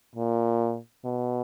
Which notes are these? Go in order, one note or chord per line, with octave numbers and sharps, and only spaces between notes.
A#2
B2